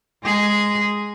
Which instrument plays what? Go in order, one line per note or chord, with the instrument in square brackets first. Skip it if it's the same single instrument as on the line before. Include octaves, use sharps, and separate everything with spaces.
[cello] G#3 G#4